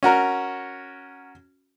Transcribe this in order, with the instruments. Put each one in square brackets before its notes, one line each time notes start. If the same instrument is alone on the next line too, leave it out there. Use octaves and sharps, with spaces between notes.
[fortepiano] C#4 F#4 A#4